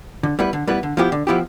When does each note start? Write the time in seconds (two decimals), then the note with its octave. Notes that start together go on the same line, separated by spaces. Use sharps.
0.23 D3
0.39 G3 B3 E4 B4
0.53 D3
0.67 G3 B3 E4 B4
0.83 D3
0.97 F3 B3 E4 G4
1.12 D3
1.27 F3 B3 E4 G4